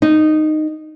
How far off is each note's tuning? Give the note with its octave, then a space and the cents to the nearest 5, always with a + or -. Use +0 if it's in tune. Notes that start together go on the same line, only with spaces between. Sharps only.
D#4 -10